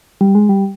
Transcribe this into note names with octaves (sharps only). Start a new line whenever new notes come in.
G3
G#3
G3